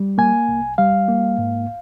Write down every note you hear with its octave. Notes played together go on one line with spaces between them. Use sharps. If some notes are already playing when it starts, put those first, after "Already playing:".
Already playing: G3
A#3 G#5
C2
G3 F5
A#3
G#2